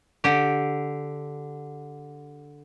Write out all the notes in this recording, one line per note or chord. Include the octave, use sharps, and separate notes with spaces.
D3 G4